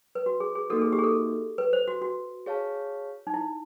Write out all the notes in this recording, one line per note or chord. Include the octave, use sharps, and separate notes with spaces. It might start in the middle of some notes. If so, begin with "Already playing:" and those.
B4
F#4
G#4
G#4
A#3 D#4 F#4 A4
G#4
G4
G#4
A4
B4
C5
F#4
F#4
G#4 C#5 F5 A5
D#4
E4